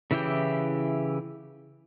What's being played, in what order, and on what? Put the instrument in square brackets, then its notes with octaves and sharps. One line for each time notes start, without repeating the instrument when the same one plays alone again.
[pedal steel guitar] C#3 E3 E4 G4 G5